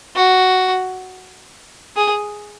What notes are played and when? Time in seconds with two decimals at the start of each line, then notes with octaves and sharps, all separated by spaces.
0.16 F#4
1.96 G#4